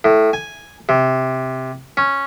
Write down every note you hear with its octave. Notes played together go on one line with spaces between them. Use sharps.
A2
G#5
C3
C#4